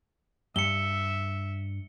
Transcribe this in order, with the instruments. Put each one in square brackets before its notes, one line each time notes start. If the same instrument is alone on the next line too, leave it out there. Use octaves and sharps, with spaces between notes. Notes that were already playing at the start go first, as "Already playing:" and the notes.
[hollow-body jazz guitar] G2 [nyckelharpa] E5 [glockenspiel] C#7 G7